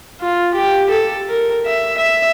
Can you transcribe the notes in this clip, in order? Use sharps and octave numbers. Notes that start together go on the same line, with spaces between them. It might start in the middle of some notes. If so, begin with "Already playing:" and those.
F4
G4
A4
A#4
E5
E5